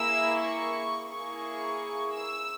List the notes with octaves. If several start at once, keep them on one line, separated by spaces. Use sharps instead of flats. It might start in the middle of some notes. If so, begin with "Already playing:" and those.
Already playing: A#3 E4 G#4 E6
C#6
A#3 E4 G#4 C#6
E6